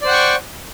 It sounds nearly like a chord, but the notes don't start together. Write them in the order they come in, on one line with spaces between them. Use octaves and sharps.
D5 C5 F#5 G5 C#6